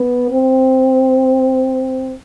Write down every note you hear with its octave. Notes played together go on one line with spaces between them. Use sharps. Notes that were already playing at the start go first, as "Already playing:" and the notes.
Already playing: B3
C4